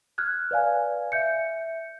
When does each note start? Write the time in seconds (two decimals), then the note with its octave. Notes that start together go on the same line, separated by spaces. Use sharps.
0.18 F6 F#6 G#6
0.51 B4 D5 F5 G#5
1.12 E5 G6 C#7